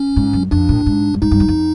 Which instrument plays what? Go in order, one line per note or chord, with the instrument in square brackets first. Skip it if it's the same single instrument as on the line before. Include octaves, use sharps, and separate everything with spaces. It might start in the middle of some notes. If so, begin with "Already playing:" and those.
Already playing: [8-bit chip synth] C#4
[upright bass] G#2
F#2
[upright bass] F2 [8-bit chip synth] D4
[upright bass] A2
G#2
G2
[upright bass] G#2 [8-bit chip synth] D#4
[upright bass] G2
F#2
F2